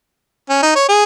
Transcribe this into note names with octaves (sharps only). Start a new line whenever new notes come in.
C#4
D#4
C#5
G#4